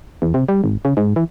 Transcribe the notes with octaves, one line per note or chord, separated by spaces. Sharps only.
E2
C3
G3
G#1
C#3
G#2
E3